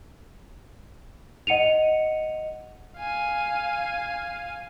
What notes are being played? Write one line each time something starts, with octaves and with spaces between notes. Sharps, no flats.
D#5 F#5 C#7 D#7 F7
F5 G#5